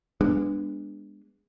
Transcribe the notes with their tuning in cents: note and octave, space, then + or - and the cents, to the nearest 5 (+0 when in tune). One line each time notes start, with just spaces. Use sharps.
G#3 -25 B3 +0 D4 +10